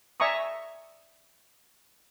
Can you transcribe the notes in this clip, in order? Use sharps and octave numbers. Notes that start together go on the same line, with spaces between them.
D5 E5 G#5 A#5 C#6 D#6